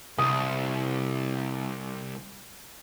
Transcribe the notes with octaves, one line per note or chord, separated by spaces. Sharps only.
C2 D#6